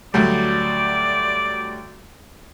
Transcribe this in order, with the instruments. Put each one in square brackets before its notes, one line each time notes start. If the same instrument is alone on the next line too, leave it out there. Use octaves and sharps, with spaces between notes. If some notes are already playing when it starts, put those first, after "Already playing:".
[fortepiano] D2 F#3 G3 [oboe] D5